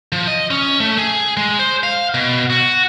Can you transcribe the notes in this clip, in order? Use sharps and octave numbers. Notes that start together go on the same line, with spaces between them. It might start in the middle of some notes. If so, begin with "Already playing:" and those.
F3
D#5
C#4
A3
G#4
G#3
C5
F5
B2
F#4